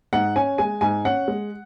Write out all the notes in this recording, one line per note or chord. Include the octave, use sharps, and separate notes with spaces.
G#2 F#5
C#4 G#5
G#3 G#5
G#2 G#5
C#4 F#5
G#3